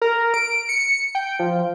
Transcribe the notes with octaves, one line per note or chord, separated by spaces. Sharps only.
A#4
D7
C#7
G5
F3